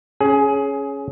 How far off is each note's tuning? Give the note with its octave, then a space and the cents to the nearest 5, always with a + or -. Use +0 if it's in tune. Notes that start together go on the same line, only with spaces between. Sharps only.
C#4 +0 G#4 +20